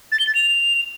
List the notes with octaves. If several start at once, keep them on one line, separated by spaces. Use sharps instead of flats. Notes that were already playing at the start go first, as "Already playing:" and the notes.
A6
G7
A6
F7